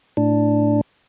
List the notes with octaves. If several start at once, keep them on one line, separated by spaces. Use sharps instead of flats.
A2 D4